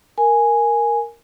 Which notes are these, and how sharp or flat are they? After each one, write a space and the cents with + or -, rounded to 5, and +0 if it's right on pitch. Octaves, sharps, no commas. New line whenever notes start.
A#4 +0 G#5 +0